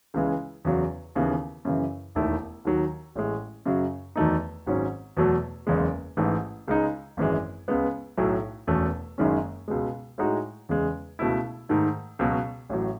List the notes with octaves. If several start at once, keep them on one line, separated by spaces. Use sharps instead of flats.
C#2 C#3 E3 G#3
E2 C#3 F#3
D#2 C#3 E3 B3
F#2 C#3 E3
E1 D#2 D#3 A3 E4
D#2 D#3 F#3
A1 A2 G#3
F#2 C#3 F#3
E2 D#3 F#3 A3 D#4
G#1 G#2 F#3 C#4
E2 B2 F#3 A3
F#1 E2 C#3 G#3
A1 G#2 E3 A3
C#2 C#3 G#3 D#4
G#1 F#2 E3 G#3
C#2 C#3 G#3 B3
B1 A2 F#3
E1 E2 B2 A3 C#4
F#1 F#2 D#3 G#3 C#4
C#2 B2 G#3
A2 G#3 D#4 F#4
E2 C#3 G#3
C#2 B2 A3 E4
G#2 D#3 A3
C#2 B2 F#3
A1 A2 F#3